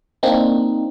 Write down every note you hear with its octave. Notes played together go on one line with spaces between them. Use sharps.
A#3 C4 D4 D#4